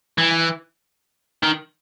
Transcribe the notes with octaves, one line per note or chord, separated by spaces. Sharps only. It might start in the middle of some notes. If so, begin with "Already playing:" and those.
E3
D#3